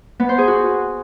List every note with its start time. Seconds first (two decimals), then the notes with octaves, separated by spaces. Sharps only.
0.20 B3
0.29 C5
0.38 G#4
0.48 F#4